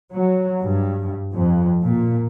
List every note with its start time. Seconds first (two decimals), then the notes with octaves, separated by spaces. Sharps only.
0.13 F#3
0.63 G2
1.34 F2
1.85 A#2